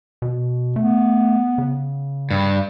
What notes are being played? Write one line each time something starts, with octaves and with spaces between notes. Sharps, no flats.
B2
A3 B3
C#3
G2